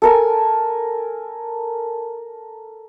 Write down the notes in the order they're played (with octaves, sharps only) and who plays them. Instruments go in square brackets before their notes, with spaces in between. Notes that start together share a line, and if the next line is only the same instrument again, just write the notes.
[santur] A4 A#4 G#5